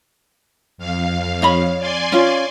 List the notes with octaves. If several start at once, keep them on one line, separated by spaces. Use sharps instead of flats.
F2 F5
C#5 D#5 B5
D5 G#5 C6
C#4 F4